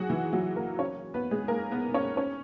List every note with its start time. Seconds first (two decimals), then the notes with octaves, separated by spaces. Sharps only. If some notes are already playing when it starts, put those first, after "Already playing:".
Already playing: F#3 F#4 G#4
0.09 E3 E4
0.33 F#3 F#4
0.56 A#3 A#4
0.79 C#4 C#5
1.14 B3 B4
1.31 G#3 G#4
1.48 A#3 A#4
1.71 B3 B4
1.94 C#4 C#5
2.17 C#4 C#5